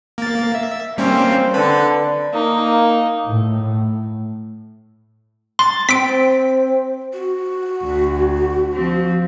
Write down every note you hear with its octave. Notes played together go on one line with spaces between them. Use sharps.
A#3 A6
E5
G3 A#3 C4 C#4
D3 B4
A#3 D#4
A2
C6 A6
C4 B6 D7
F#4
D2
F3 C4